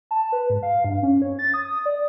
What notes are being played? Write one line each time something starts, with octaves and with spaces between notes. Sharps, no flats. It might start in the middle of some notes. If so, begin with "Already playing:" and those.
A5
B4
G#2
F5
G2
C#4
C#5
A6
D#6
D5